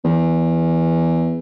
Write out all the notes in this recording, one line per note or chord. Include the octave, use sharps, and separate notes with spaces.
E2